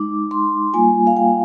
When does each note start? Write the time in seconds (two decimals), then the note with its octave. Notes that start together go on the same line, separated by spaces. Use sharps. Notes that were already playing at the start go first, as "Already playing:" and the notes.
Already playing: G#3 D#4 D6
0.31 C6
0.73 G3 A#3 F4 G#5
1.07 F5
1.17 G5